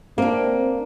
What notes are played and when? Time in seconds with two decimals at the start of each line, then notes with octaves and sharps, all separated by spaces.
0.18 A#3 C4 D4